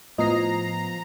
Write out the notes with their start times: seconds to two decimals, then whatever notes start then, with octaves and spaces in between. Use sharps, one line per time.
0.18 A2 F3 B3 D#5 A#5 C7